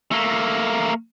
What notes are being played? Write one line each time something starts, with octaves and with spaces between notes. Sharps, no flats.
A3 A#3